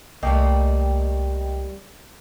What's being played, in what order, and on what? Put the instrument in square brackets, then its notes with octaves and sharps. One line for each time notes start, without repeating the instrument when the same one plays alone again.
[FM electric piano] C2 D#5 G5 [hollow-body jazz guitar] G3 A3 A#3